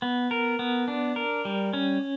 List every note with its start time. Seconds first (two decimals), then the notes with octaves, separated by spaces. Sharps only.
0.02 B3
0.31 A#4
0.59 B3
0.88 D4
1.16 A#4
1.45 G3
1.73 C#4